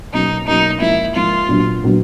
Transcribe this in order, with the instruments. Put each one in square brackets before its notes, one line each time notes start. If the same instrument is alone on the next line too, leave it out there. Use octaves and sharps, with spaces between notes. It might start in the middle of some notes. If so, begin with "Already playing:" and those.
[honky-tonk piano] B2 F#3 A#3 C#4 [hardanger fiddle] D#4
[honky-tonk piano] B2 F#3 A#3 C#4 [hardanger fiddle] D#4
[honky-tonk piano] G#2 F3 A#3 [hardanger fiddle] E4
[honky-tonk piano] G#2 F3 A#3 [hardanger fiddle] F4
[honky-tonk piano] A#2 F#3 B3 D4
A#2 F#3 B3 D4